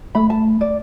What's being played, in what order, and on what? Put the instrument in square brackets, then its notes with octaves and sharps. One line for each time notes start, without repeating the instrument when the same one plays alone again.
[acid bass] A3 [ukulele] B5
[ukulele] A5
D5